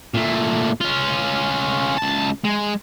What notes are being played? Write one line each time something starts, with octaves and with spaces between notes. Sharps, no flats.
A#2 A3
C#4 F4
C#2 A5
G#3